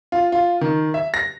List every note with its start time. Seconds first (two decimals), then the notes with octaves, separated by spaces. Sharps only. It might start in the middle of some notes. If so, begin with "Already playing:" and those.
0.12 F4
0.32 F4
0.61 D#3
0.94 E5
1.14 A#6